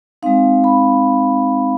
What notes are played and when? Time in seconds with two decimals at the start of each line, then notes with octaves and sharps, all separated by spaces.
0.23 G#3 C4 D#4 F5
0.64 B5